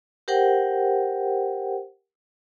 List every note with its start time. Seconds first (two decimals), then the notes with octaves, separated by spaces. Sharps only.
0.28 G4 A#4 C5 F#5 G5